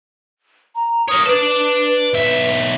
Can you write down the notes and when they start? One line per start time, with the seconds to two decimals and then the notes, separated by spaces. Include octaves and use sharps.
0.75 A#5
1.08 A#4 C#5 D#6
1.26 B4 D5 A5
2.14 B1 E5